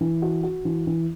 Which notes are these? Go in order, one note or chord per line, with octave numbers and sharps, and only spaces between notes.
E3
F#4
F#4
E3
E3